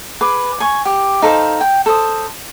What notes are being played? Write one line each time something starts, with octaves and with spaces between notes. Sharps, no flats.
G#4 B4 D6
G#5 C#6
G4
D#4 A4 C5 F5
G5
A4 C5 D#6